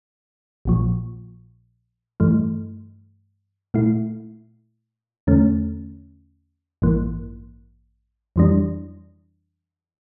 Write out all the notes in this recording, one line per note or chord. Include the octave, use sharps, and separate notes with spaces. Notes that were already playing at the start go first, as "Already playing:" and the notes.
A#1 A#2 F3
G2 E3 A3
A#2 A3 E4
E2 D3 A3 C#4
A1 G2 E3 A#3
F2 E3 G3 D4